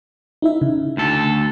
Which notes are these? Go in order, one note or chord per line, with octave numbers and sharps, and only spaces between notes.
D#4 E4 E5
C#3
D2 A4